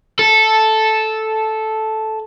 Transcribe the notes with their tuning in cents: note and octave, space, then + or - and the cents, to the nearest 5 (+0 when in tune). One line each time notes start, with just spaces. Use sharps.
A4 -5